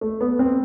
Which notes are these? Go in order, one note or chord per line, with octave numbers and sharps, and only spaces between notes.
A3
B3
C4